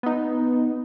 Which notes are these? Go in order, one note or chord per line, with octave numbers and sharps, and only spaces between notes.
B3 D#4